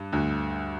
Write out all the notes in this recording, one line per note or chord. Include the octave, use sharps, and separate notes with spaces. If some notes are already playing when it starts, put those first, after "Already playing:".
Already playing: G2
D2 D3